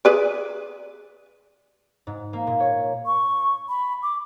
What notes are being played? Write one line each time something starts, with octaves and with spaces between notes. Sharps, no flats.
G#4 B4 D5
G#2
A#3
A#2
C#5
C#6
B5
D6